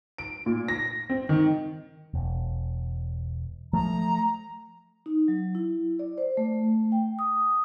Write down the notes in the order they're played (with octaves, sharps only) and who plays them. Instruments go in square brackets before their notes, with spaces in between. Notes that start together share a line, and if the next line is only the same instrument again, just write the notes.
[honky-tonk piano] D7
A#2
A#6
C4
D#3
[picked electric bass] E1
[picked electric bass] F3 A3 [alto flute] A#5
[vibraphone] D#4
F#3
E4
D5
C5
A3
G5
D#6